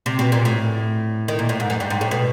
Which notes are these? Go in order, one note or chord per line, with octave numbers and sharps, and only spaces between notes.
C3
B2
A#2
A2
D#3
A#2
A2
G#2
F#2
G2
G#2
A2
B2